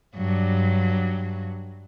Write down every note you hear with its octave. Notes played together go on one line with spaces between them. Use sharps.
G2 F#3